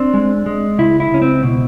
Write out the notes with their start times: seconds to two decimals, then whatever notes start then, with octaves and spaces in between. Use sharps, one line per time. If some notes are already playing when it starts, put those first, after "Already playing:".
Already playing: C4 D4
0.14 G#3
0.46 G#3
0.78 C#2 E4
1.00 E4
1.11 C#2 C#4
1.22 C4
1.43 B2